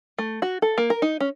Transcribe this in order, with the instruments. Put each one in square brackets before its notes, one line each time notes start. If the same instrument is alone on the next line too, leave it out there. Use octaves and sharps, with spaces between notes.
[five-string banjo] A3
F#4
A4
A#3
A#4
D#4
C#4